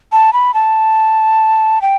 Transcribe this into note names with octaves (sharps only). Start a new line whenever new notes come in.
A5
B5
A5
G5